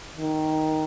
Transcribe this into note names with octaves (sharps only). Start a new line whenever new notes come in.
D#3